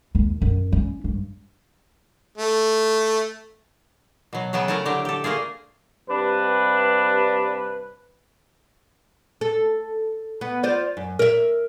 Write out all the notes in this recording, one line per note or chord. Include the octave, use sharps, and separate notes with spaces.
D#2
F#2
C#4
G2
A3
B2 F#3
C#3 F#3 B3 E5 G5
A3 E4 A4 A#4
D3 F#3 G4 A#4
G4 A4
A3 A#3 F4 G#4
G2 C3 D4 B4
A4
B3
F4 C5 D5
F#2
A#4 E5